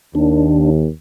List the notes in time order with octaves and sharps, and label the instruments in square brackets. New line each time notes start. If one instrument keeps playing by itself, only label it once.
[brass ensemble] D#2 [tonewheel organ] D4